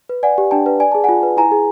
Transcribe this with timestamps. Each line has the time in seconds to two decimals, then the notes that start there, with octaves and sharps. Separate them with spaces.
0.09 B4
0.23 D5 F#5 G#5
0.38 G4
0.51 D4 G5 A5
0.66 B4
0.80 D5 G#5
0.92 G#4 A5
1.04 F4 F#5 G#5
1.23 B4
1.37 E4 G#5 A#5
1.51 G#4